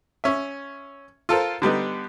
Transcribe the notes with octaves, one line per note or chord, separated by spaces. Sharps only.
C#4 E5
F4 A4 A#4 C5
D3 G3 B3 D#4